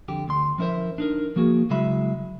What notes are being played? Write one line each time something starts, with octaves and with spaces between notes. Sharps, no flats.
F2 D3 G4
D2 C6
F3 C#4 E4 A#4 C5 E5
D4 D#4 A#4
F3 A#3 F#4 G#4
C#3 F#3 G#3 E4 E5 B5